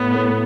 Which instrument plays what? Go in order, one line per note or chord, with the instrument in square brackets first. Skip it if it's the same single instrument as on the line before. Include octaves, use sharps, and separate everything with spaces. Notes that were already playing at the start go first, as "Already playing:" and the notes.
Already playing: [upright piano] A2 [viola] B3
[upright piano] A2